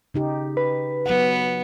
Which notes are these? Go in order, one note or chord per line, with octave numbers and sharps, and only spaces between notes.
C#3 D#4 G4
B4
F#3 B3 F#5